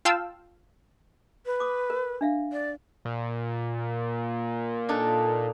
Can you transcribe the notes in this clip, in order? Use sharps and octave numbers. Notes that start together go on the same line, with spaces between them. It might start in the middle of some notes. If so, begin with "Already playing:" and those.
F4 F5 G5 A5 E6
B4
D6 D#6
A#4
D4 E5 F5
D5
A#2
D4 D#4 A4